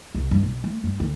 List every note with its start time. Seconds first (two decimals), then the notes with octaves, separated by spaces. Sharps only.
0.15 C2
0.31 G2
0.43 B1
0.64 A3
0.84 G2
1.00 D2